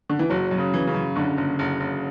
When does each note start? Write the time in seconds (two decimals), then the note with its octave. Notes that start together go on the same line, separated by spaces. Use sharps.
0.10 D3
0.19 E3
0.30 F#1 F#3
0.51 F#2
0.58 C#3
0.74 E3
0.87 C#3
0.94 F#2
1.15 F#1 D3
1.37 F#1
1.59 F#1
1.80 F#1